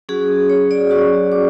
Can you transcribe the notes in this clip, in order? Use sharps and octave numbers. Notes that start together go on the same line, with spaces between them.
F#3 C#4 F#4 G#4
C#5
D5
F#3 C#4 F#4 C#6
D6